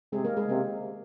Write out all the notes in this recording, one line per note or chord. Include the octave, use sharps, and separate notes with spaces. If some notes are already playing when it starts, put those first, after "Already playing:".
C3 G#3 G#4
A#3 A#4
G#3 G#4
C3 A#3